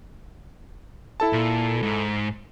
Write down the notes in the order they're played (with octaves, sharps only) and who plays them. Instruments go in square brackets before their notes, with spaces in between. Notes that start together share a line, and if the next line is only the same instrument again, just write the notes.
[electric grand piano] E4 A4 A5
[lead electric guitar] A#2
G#2